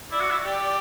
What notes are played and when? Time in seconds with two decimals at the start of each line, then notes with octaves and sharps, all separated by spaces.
0.11 E4 D5
0.20 F#4
0.30 E4
0.45 G4 D5